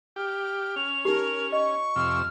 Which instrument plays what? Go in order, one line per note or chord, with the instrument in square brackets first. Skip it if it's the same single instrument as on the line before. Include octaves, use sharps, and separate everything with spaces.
[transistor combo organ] G4 [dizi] F6
[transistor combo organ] C#4 [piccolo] F7
[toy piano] D#4 G4 [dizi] A#4
[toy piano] D#5 [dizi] C#6
[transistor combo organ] F2 C3 E6 [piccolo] F6